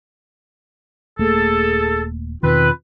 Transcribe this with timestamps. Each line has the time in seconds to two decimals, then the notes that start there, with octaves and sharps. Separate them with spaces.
1.19 D#1 A3 A#3 G#4 A4
2.43 E2 B2 D#3 C4 F4 B4